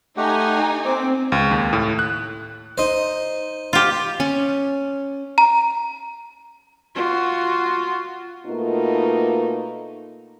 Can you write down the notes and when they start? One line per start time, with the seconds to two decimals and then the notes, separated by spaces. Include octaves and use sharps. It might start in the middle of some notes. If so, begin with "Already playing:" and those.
0.17 A3 D#4 G4 F#5 G#5
0.85 C4 D6
1.32 C#2
1.51 D#2
1.73 A2
1.99 F#6
2.78 D#4 C5
3.73 F4 G4
4.20 C#4
5.38 A#5
6.95 F4 F#4
8.46 B2 A3 A#3 D#4 F4